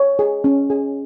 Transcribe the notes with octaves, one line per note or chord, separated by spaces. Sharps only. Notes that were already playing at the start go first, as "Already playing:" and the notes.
Already playing: C#5
G#4
C#4
G#4